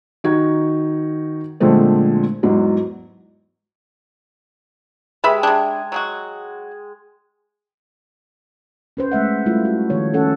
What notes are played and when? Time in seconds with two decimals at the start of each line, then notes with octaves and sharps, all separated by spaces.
0.24 D#3 D#4 F#4 G#6
1.60 A#2 D3 F3 G#3 A3 C4
2.43 E2 G#2 F#3
5.24 G#3 G4 B4 E5 B5
5.43 C3 D4 G#4
5.92 F#3 G#3 F#4
8.97 C#4 B4 C5
9.12 G#3 A3 E5 F#5
9.46 G3 A3 E4 F4
9.65 F#4
9.90 D#3 F3 C#5
10.14 C#4 A4 F#5